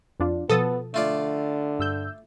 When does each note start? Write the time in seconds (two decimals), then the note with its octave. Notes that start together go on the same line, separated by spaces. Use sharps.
0.20 F2 D4 F4
0.50 B2 F3 B3 A4 D#6 A6
0.94 D3 A3 F4 D5
1.79 G2 E6 G6